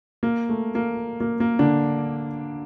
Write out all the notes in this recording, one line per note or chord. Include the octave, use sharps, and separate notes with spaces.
A#3
A3
A#3
A#3
A#3
D3 D4